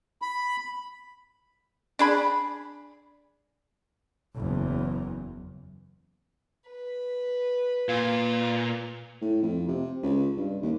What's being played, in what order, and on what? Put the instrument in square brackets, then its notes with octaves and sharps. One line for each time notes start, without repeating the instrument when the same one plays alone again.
[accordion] B5
[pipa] D4 G#4 B5
[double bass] F#1 E2
[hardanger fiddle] B4
[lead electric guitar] A#2 [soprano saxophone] F4
[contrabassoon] A2
F2
C3
C#2
G2
D#2